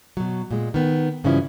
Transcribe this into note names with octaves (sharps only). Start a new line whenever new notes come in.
B2 F#3
A#2 G#3
D#3 B3
G2 C#3 E3 F3 C#4 E4